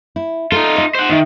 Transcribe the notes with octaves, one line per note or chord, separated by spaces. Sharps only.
E4
D#4 F4 A4
D#5
C5 F#5
D#3 D#4 E5